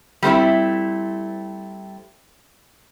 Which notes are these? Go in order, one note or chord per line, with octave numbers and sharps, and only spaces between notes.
G3 A3 C4 E4